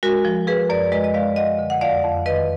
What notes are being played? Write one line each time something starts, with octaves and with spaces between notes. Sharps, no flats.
G#3 F#4 A#4
F3
F3 G#4 B4
F#2 A#4 D5
G#3 B4 D#5
D#5
G#3 D5 F5
G#3 D#5 F#5
D3
F#5
F2 D5 F5
F2
D#3 B4 D#5